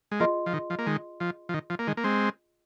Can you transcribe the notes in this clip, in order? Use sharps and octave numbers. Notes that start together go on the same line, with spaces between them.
G#3
F3 A#3 F4 G#4 D#5 C6
F3
D#3
F3
A#3
D#3 G#3
F3
F3
D#3
F3
A#3
D#3 G#3
A#3
G#3 C4